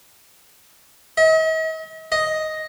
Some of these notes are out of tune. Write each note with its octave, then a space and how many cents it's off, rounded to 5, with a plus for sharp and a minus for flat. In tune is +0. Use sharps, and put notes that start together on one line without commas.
D#5 +45
D#5 +5